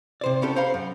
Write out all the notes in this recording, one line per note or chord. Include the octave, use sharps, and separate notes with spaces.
C3 C5 D5
B3 C#4 G4 A4
C5 C#5 F5 A#5 B5
F#2